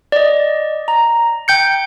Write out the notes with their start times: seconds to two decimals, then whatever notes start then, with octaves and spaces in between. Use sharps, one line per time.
0.12 D5 D#5
0.88 A#5
1.48 G5 G6 C#7